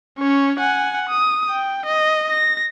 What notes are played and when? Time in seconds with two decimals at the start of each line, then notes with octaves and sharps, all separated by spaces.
0.19 C#4 C#5
0.60 F#5 G#5
1.09 D#6
1.50 G5
1.86 D#5
2.31 A#6